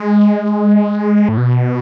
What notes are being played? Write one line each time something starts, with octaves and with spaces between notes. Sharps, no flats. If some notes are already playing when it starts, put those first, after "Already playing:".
Already playing: G#3
A2
B2